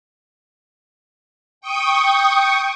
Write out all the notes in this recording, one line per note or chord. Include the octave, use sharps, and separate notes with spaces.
G5 C#6 D#6